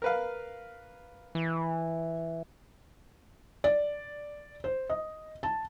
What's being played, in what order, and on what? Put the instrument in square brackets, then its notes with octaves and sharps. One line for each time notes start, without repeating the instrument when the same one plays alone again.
[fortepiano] A#4 B4 F5
[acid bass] E3
[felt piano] D5
C5
D#5
A5